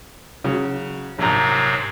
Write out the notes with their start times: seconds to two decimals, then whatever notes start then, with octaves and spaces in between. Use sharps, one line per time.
0.44 C#3 F#3
1.19 A#1 G#2 C3 F#3 A#5